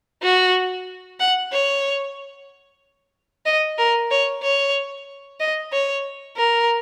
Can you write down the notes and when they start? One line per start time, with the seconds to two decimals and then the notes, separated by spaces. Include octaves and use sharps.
0.23 F#4
1.20 F#5
1.52 C#5
3.46 D#5
3.78 A#4
4.11 C#5
4.43 C#5
5.40 D#5
5.72 C#5
6.37 A#4